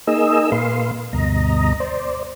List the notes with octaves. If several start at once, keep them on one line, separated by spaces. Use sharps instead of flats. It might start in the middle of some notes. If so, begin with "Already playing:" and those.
A#3 D#4 G#4 D#5 E6
A#2 A#3 B4 F5 C6
D2 G2 B2 D#5 A#5
C5 D5